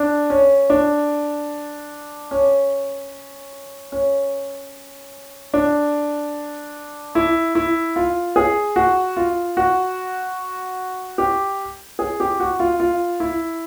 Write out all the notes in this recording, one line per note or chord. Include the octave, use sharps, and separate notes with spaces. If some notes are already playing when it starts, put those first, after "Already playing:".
Already playing: D4
C#4
D4
C#4
C#4
D4
E4
E4
F4
G#4
F#4
F4
F#4
G4
G#4
G4
F#4
F4
F4
E4